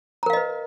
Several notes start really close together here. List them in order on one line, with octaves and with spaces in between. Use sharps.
A#5 A#4 F5 D#5 B4